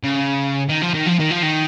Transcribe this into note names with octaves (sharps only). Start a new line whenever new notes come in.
C#3
D#3
F3
D#3
F3
D#3
F3
D#3